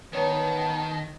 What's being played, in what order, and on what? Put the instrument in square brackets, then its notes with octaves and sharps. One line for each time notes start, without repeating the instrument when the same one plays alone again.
[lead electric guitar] D#3 [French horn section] B3 [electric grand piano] B4 C#5 A#5 [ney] A5